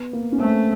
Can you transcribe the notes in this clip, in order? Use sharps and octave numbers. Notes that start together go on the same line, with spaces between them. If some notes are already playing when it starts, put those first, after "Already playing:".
Already playing: B3
A#3
C#4
A3 C4